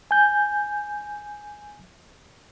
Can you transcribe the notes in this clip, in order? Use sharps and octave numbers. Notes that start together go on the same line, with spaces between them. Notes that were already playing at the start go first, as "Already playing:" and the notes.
G#5 G6